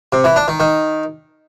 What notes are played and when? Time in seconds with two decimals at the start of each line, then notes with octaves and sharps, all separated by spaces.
0.13 C3
0.24 E3
0.36 D4
0.48 D#3
0.60 D#3